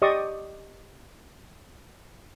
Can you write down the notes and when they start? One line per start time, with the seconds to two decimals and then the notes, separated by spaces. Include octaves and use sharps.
0.02 G4 D5 D#5 C6 C#6 D#6